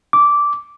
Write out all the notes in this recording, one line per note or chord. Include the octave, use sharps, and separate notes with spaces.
D6